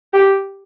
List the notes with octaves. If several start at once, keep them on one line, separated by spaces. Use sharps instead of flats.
G4